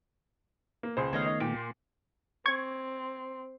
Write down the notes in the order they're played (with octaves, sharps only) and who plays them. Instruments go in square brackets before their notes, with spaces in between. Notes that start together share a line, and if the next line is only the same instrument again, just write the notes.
[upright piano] A#3
C#2 G#4 C5
[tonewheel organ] D#3 A3 B3 [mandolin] C#5 D#5 F5
[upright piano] D#4
[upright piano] A#2 [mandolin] G4
[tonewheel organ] A#3 C6
[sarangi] C4 [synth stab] C#6 G#6